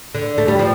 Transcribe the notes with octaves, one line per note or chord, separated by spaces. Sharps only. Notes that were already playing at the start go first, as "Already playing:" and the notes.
D3
A3
G3
F3